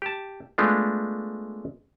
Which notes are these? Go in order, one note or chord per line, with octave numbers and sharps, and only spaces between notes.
G4 A5
G#3 A3 B3 D4 F4